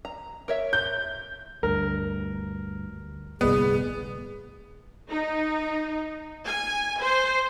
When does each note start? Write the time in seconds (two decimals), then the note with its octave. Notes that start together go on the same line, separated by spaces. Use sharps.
0.05 A#5
0.48 A#4 C#5 E5
0.73 G6
1.63 D2 G2 A#4
3.41 G1 C2 A2 B3 G#4
5.09 D#4
6.46 G#5
7.00 C5